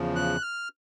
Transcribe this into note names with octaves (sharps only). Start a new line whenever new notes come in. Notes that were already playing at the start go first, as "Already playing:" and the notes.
Already playing: E2 C#3 F3
F#6
F6